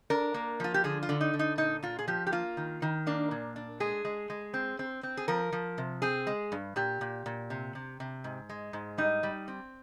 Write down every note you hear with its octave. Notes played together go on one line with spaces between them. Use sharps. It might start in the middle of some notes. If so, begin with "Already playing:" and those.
D4 A#4
A#3
F3 F4
G4
D3 G#4
F4
D3
D#4
D3
D#4
A#2 D#4
A#2 F4
G#4
F3 G4
G4
A#3 F4
D#3
D#3
A#3 D4
A#2
D4
G#3 G#4
G#3
G#3
C4
C4
C4
G#4
F3 A#4
F3
C3
C4 G#4
G#3
G2
A#2 G4
A#2
A#2
C3
C3
C3
G#2
G#3
G#2
G3 D#4
G3
C4